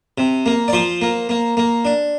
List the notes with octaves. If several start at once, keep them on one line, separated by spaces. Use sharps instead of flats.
C3
A#3
D5
F3 C5
A#3
A#3
A#3
D4